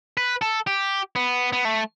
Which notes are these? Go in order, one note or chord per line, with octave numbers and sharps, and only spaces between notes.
B4
A4
G4
B3
B3
A3